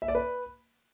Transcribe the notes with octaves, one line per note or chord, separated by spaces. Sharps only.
E5
D5
B4